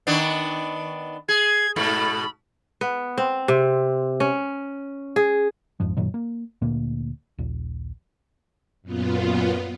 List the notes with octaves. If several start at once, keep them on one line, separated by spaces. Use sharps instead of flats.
D#3 B3 D4
G#4 G#6
G#2 B2 A3 B5
B3
C4
C3
C#4
G#4
G#1 F2 G#2 F3
F#2 A#2 D#3 F#3
A#3
D2 A#2 A#3
A#1 D#2
F#2 A#2 B3 F4